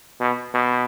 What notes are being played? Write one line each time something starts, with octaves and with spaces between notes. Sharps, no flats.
B2
B2